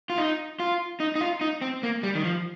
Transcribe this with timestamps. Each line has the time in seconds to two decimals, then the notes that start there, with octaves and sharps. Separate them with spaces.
0.10 F4
0.18 D#4
0.60 F4
1.00 D#4
1.15 D#4
1.21 F4
1.41 D#4
1.61 C4
1.83 A#3
2.03 G3
2.15 D#3
2.24 F3